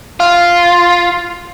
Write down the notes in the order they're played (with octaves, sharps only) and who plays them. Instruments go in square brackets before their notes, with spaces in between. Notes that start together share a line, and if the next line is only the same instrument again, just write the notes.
[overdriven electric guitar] F4